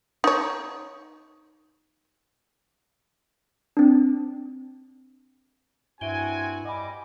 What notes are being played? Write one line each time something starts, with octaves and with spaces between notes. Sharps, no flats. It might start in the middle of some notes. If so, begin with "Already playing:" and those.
D#4 C#5
C4 D4
G2 C4 E4 F#4 E5 G#5 D7 G7
G3 D#5 F#5 G#5 B5 D6